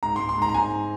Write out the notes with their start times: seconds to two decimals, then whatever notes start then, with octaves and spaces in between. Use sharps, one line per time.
0.03 G#2 A#5
0.16 G#2 C6
0.29 C6
0.38 G#2 A#5
0.49 A#5
0.54 G#2 G#5